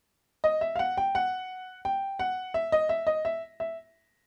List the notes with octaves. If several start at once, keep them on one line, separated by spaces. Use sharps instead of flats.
D#5
E5
F5
F#5
G5
F#5
G5
F#5
E5
D#5
E5
D#5
E5
E5